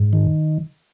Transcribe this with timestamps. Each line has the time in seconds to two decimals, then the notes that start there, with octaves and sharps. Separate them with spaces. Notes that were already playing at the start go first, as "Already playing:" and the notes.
Already playing: G#2
0.13 D#3